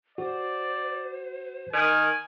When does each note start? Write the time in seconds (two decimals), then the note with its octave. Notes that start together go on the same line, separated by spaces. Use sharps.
0.18 F#4 C5 D5
1.73 D#3 A#4 G#5